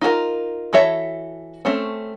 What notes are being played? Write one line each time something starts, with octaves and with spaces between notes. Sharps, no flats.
D#4 F4 F#4 A#4
E3 F#4 A4 C#5 E5
A3 C4 C#4